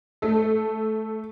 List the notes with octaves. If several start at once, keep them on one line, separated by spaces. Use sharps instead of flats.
A3 A4